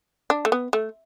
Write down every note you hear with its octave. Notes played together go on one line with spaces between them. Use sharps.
D4
A3
B3
A3